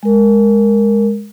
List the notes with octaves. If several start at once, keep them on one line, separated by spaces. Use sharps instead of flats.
G#3 A#4